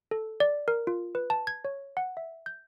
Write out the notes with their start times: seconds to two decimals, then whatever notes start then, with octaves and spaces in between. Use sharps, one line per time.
0.11 A4
0.40 D5
0.68 A#4
0.87 F4
1.15 B4
1.30 A5
1.47 G#6
1.65 C#5
1.97 F#5
2.17 E5
2.46 G6